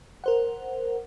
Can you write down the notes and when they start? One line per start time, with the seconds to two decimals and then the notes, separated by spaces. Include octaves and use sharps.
0.24 A#4 C5 F#5